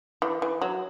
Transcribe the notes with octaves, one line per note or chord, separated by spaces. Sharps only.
E3
E3
F#3